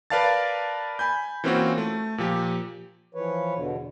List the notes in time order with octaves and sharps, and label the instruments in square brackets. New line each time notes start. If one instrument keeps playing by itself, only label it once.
[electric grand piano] A#4 B4 D5 F5 A5 A6
G#5 B5 G6
E3 A#3 C4 C#4 F4 F#4
A3
A#2 F3 G4
[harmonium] E3 F3 B4 C#5
E2 B2 D3